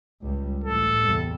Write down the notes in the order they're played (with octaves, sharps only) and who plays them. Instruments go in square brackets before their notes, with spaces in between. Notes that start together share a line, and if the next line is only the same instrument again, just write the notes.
[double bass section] C#2 G3
[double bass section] A1 A2 [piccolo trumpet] A4
[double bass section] E2 C3 G3